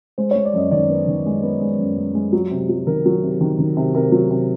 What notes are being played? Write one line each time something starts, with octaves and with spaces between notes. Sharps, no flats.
G#3 C5
G#3 C#5
D5
F#2 D#5
D#3 D5
B3
D#3
G#3
B3
G#3
F#2
G#3
G#3
F#3
C3
F#3
D#3 A#4
F#3
C3
D#3
D#3
C3
C3 A#4
F#3
C3